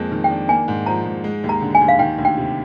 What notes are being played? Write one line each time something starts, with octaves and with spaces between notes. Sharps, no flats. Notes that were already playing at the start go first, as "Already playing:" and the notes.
Already playing: F2 G#3 A#3
D#3
G5
D4
A#3 G#5
G#2
F3 A#5
G#2
G#3
D#2
A#5
D3
G#5
D#2
F5
D#3 G5
D2
G5
C3